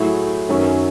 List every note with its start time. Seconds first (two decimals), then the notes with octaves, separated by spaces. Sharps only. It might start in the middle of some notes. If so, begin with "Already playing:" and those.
Already playing: A2 F#3 A3 E4 G#4
0.49 F#2 D#3 F#3 C#4